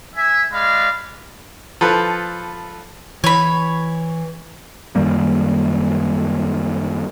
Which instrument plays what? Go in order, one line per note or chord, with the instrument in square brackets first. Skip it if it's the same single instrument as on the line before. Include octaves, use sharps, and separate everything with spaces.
[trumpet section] E5 G#5
G#3 D5 F5 B5
[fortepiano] F3 A4 B4
[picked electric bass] E3 [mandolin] C#5 B5
[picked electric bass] F#2 D#3 G3 A#3